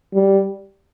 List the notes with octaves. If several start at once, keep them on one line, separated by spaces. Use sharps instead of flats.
G3